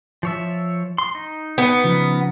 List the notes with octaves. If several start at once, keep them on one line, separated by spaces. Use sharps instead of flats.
F3 C#5 E5
C6
D#4
B3
C#3 F3